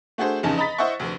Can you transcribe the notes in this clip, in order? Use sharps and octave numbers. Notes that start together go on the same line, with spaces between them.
A3 D4 F#4 G#4 A4 C5
F1 E2 C#3 D#4 G#5 A5
D#5 A#5 B5 A6 B6
E4 C5 D#5 E5 F#5 C#6
F1 D2